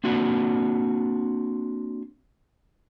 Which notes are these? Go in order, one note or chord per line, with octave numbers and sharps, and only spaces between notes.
A#3 C4 D4 F#4 D5